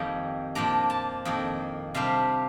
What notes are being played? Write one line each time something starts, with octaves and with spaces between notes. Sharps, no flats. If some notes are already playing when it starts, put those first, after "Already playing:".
Already playing: F2 D#3 G3 A#3 A#5
A#2 F3 A#3 D4 A#5
A5
F2 D#3 A#3
C3 G3 D4 F5